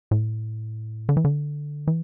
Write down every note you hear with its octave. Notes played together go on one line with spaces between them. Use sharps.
A2
D3
E3
D3
E3